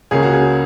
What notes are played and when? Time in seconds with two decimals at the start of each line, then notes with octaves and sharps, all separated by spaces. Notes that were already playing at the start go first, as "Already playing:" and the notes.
0.11 C#2 C#3 A#3 C#4 G#4
0.23 F#4
0.33 G#4